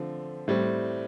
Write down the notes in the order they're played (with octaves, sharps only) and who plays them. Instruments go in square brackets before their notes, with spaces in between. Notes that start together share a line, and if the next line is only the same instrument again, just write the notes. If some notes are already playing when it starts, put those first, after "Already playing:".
Already playing: [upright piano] D3 F3 A3 C4
A2 G3 C4